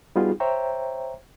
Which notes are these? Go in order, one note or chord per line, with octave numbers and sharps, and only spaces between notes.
G3 B3 D#4 F4 F#4 G#4
C5 C#5 E5 G5 A#5